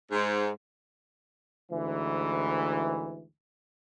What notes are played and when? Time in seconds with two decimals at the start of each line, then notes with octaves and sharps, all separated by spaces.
0.12 G#2
1.71 D2 G#2 E3